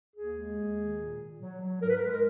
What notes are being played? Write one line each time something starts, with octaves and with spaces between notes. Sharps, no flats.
D#2 G#4
G#3
D#2
D#3
A#2
A#2
F#3
F#3
G#2 A#4
B4
A#4
G#3 B4
A#4